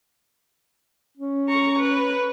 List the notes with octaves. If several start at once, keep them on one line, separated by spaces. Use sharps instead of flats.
C#4
A#5 C#6
B4